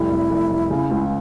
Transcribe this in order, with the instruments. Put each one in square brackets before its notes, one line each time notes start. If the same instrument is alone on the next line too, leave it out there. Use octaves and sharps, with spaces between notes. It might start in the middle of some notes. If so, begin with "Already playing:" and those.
Already playing: [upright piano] F1 G3 [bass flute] E4
[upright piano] F1
F1
F1
C#3
C#2